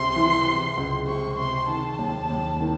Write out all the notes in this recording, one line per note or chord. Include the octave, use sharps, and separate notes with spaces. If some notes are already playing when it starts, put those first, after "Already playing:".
Already playing: C#2 C3 C6
E3
C3
C#2
C3 C#6
C3 C6
D#3 A5
D#2
D#2
D#3